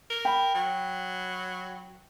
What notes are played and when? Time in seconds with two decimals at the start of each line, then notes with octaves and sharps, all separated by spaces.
0.10 A#4
0.25 G5 B5
0.54 F#3